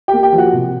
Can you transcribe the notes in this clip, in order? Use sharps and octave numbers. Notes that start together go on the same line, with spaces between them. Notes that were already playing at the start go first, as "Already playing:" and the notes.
G4 G5
A#3
G4 G5
F3
F#4 F#5
C3